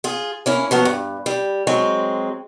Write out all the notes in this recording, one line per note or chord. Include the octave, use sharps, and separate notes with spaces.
F4 G#4
A#3 C#4 E4
F3 F#3 B3
G2
G3
F#3 G#3 C4